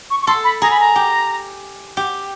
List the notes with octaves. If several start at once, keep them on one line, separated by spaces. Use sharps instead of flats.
C#6
C#6
A4 C6
B5
G#4 A#5
B5
A#5
G4
G4